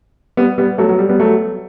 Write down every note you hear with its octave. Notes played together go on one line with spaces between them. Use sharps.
G3 B3
G3 B3
F#3 A3
F#3
G3
G3 B3
F#3 A3